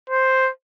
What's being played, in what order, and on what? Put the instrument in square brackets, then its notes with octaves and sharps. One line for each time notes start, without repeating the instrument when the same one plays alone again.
[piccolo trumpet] C5